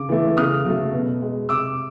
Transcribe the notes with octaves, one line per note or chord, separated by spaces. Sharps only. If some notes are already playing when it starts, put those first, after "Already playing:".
Already playing: C#3 D6
E3 A3
C#3 D#6 F6
F#3 A3
B2
G#3
C3 D6 E6